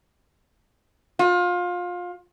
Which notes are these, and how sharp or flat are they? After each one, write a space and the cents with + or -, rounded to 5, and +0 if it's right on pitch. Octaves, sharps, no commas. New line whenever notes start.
F4 +25